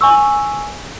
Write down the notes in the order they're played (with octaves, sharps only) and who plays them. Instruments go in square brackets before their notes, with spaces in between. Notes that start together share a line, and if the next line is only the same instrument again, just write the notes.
[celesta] G#5 C#6 E6